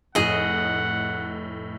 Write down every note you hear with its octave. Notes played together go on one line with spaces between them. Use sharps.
F1 A2 G#4 D#5 F#5